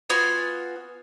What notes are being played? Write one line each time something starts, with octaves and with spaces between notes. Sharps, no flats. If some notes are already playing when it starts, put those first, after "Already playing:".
B3 F4 F#4 G#5